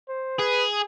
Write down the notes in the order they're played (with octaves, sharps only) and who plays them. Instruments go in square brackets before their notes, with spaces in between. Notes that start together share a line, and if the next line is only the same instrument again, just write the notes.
[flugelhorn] C5
[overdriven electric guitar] G#4 [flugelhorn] B4